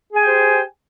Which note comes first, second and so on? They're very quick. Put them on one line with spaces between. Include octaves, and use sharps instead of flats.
G#4 G#5 G5 G4 C5